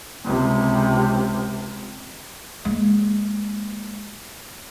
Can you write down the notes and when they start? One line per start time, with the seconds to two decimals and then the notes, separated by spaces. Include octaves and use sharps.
0.25 C#2 C3
2.65 G#3 A#3